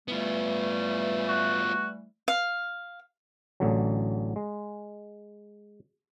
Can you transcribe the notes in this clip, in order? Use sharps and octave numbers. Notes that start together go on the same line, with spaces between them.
E3 G3 A3 B3 F4
F#4
F5
A1 D3 F#3
G#3